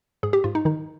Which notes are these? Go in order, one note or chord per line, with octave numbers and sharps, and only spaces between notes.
G#2 G#4
G4
G#2 F4
D#4
D#3 D#4